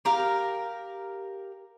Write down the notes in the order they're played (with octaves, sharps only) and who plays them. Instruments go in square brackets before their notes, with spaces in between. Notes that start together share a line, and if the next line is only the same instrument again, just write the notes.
[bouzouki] G4 A#4 F5